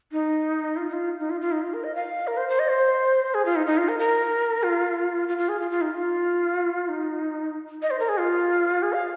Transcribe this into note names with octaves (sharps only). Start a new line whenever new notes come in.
D#4
F4
D#4
F4
D#4
F4
F4
D#4
F4
A#4
D#5
F5
A#4
C5
C5
D#5
C5
G#4
F4
D#4
D#4
F4
A#4
A#4
F4
F4
F4
G#4
F4
F4
D#4
F4
D#4
D#5
C5
A#4
G#4
F4
G#4
F5